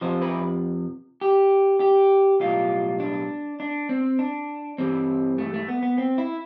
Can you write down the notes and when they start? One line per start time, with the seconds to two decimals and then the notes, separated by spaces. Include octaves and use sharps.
0.01 F2 C3 F3 C5
0.22 B4
1.21 G4
1.80 G4
2.40 B1 A2 G3 F4
3.00 D4
3.60 D4
3.89 C4
4.19 D4
4.78 G2 E3 G3 C4
5.38 A3
5.54 A3
5.68 B3
5.83 B3
5.98 C4
6.18 E4